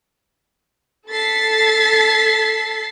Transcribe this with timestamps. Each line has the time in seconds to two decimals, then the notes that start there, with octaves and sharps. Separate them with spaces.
1.09 A4 A6 B6 C7